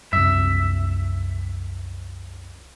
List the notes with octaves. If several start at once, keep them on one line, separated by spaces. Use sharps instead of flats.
C2 F#2 E5